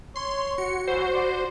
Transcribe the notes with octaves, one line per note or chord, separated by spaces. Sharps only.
C#5 C6
F#4 C#7
E3 C5
D5 C6